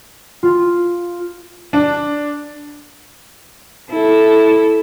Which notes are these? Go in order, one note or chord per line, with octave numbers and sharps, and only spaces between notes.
F4
D4
E4 A4